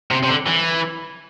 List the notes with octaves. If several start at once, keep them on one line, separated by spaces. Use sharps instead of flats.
C3
C3
D3
E3